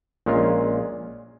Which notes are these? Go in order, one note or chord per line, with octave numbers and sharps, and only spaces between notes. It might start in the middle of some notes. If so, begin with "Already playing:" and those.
A#1 A#2 G#3 C#4 F4